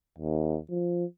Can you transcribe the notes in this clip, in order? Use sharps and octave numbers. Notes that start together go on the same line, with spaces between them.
D#2
F3